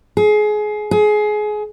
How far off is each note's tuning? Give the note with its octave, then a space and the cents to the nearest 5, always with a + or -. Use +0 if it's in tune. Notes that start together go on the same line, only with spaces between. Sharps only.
G#4 +25
G#4 +25